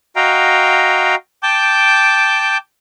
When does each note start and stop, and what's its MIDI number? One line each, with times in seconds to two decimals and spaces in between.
0.16 1.15 66
0.16 1.15 75
0.16 1.15 77
0.16 1.15 79
0.16 1.15 82
1.43 2.57 79
1.43 2.57 81
1.43 2.57 86
1.43 2.57 91